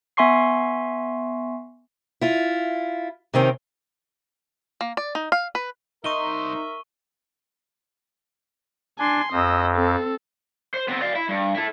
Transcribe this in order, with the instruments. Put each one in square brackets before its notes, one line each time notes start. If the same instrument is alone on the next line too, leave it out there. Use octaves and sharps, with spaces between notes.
[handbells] B3 E5 G#5 C6 C#6 C7
[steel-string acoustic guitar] E4 F4
C3 D#3 C4 C#4
[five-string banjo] A#3
D5
D#4
F5
B4
[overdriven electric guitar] C2 C6 [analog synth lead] D#4 [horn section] A#4 E5 [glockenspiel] C#6 D#7 G7
[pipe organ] D4 [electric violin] G#5 C6
[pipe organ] F2 [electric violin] D#5 E6
[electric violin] C4 A4
[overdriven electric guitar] C5
B3 C4
D5 F5
E4
G2
E4 A4